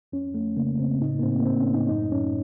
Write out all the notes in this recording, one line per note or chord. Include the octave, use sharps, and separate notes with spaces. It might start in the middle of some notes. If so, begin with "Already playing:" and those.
F2 C#4
F2 A3
C#3 A#3
C#3 C4
A2 D#4
A#3
A2 C4
A#3
A2 C4
C#4
A2
D#4
F#2 D#4
F#2 C#4